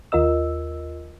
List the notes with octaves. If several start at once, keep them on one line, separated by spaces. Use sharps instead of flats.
D#2 F4 A#4 D#5 E6